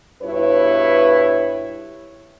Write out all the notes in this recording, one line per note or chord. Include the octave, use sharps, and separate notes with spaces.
G2 B2 E4 B4 C#5